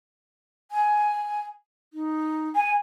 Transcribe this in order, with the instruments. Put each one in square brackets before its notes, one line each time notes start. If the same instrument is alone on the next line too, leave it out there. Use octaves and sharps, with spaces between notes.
[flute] G#5
D#4
[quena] G#5